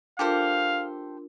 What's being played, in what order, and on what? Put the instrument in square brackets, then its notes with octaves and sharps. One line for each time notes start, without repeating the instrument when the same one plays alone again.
[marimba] D4 F4 A#4 [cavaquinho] G4 A4 C5 [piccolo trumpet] F5